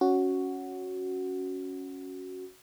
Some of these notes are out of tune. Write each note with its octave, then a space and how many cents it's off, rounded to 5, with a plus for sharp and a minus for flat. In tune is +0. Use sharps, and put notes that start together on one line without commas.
C#4 +0 F#4 +0